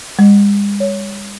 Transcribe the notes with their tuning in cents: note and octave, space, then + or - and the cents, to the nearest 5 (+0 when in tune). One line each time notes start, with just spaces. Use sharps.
G#3 -45
C#5 +10